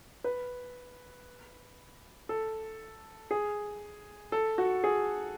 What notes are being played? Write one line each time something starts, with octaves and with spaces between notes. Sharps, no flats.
B4
A4
G#4
A4
F#4
G#4